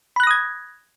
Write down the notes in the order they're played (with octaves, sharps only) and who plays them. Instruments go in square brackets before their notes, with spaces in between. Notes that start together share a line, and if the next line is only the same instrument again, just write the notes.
[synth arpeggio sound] B5
F#6
A#6
D#6
G#6